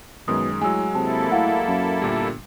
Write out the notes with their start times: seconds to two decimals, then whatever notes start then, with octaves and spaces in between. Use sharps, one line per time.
0.28 F#2 B2 D#3 G#3 D#6
0.62 A2 F#3 G#3 G#5 E6
0.95 C3 A#3 E4 A4 A5
1.32 A2 F5 F#5
1.68 F#2
2.01 G1 A#2 G3